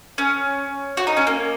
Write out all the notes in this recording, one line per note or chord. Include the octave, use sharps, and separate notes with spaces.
C#4
F#4
D#4
C#4
A#3